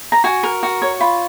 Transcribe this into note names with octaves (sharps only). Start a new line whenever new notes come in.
A#5
F#4 G#5
A#4
F#4
C#5
F4 B5